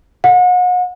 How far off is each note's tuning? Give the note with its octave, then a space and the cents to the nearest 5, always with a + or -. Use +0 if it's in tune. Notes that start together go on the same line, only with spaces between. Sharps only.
F#5 -35